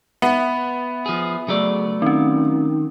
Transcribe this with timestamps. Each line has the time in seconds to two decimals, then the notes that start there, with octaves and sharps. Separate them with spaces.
0.22 B3 E5
1.06 F3 G#4
1.48 C#3 F#3 A3 D5
2.02 D#3 C4 C#4